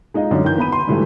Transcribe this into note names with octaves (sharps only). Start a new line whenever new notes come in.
G#3 D#4 F4 D#5
F#2 D3 C#4 D#4
D#3 E3 G6
B3 B4 B5 D#7
C6
G#2 D3 E3 F#3 G3 A3